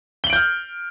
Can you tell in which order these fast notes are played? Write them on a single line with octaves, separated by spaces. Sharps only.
G7 F#7 D7 G6 F6